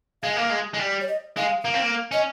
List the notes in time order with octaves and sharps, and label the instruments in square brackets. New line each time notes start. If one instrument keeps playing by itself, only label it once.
[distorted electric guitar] G#3 [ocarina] F5
[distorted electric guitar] A#3
G#3
G#3
G3
[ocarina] C#5
D#5
[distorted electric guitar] G#3 [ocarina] F5
[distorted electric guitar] A#3 [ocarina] F5
[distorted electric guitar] C4
A#3
[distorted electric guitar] C#4 [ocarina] D#5